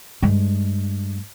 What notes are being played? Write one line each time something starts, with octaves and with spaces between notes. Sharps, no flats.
G2 G#3